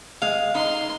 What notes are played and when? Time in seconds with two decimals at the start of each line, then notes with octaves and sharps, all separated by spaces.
0.22 G#3 F5
0.55 D#4 C6